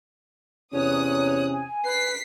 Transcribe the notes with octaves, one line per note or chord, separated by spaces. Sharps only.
E2 C3 C#4 C#5 D#6 F#6
G#5
B4 B6 C7